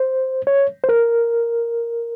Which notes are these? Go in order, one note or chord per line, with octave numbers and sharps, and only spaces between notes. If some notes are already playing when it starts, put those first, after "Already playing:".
Already playing: C5
C#5
C5
A#4